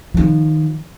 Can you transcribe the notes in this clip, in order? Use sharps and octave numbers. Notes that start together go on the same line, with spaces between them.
D#3 F3